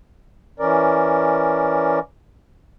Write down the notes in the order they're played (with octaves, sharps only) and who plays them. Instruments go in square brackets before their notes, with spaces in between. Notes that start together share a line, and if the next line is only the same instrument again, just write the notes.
[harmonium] E3 C#4 A#4 D5